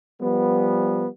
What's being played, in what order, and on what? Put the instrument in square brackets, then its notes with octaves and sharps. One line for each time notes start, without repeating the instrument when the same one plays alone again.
[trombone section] F3 G3 B3